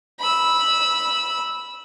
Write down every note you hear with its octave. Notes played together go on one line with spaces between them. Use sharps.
B5 E6